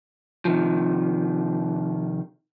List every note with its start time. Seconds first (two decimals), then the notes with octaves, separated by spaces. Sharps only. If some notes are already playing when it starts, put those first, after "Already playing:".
0.45 C3 D#3 F3